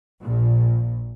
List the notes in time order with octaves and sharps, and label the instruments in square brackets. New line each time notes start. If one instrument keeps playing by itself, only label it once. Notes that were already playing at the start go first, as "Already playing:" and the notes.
[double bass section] A#1 A#2